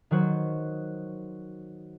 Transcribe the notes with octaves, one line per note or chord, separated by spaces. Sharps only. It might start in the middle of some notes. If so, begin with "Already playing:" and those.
D#3 F#3 F#4 C5